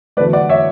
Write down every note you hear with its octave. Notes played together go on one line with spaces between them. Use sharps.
E2 D3 F#3 A3 B4 D5
D5 F#5
C#5 E5